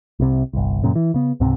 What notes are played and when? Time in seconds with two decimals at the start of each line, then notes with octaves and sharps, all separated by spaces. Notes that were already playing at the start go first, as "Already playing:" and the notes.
0.20 C2 C3
0.53 G1 C2
0.84 F#2 A#2 C#3
0.95 E3
1.14 C#3 B3
1.40 C#2 G#2 C3 C4